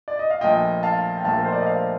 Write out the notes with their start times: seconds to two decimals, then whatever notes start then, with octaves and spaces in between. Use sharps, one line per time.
0.08 D5
0.19 D#5
0.30 F5
0.41 A#1 A#2 A3 D#5 G5
0.83 F5 A5
1.17 G5
1.24 A#1 A#2 A3 F5 A5
1.37 A#4
1.45 C5
1.52 D5
1.58 D#5
1.66 D5 F5